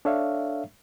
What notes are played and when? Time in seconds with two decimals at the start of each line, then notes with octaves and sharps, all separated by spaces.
0.05 D4 A4 C#5 E5 F5